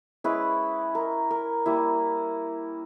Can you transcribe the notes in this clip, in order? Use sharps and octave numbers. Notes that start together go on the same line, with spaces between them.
G#3 C#4 E4 B4
A#4
A#4
G3 A#3 E4